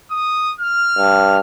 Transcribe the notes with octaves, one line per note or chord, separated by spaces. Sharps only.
D#6
F6
G2